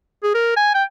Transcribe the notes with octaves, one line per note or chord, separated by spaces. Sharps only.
G#4
A#4
G#5
G5